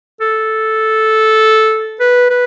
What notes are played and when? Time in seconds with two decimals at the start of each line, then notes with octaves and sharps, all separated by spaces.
0.21 A4
2.00 B4
2.30 B4